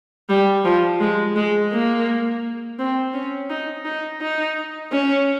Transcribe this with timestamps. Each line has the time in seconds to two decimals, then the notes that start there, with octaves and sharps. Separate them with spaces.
0.29 G3
0.64 F3
1.00 G#3
1.36 G#3
1.72 A#3
2.79 C4
3.14 C#4
3.50 D#4
3.85 D#4
4.21 D#4
4.92 C#4